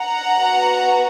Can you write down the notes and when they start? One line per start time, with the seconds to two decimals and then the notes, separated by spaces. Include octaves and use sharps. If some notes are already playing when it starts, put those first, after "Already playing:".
Already playing: F#5 A#5
0.40 B3 F#4